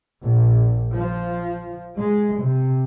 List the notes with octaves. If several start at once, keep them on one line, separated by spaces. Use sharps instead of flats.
A#1
F3
G#3
C3